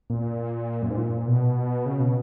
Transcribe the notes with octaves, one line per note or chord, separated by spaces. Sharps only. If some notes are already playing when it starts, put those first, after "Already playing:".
A#2
F#2
G#2
A#2
B2
C#3
B2